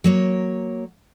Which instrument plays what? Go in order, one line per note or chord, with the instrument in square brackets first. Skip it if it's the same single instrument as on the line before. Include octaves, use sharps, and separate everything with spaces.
[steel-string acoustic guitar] F#3 A#3 C#5